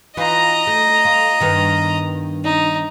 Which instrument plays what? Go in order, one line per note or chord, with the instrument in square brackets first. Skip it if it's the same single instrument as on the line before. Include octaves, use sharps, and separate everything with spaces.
[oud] E3 D#4 F4 [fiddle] D#5 A#5
[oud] A3
F4
G2 D#3 B3
[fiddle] D#4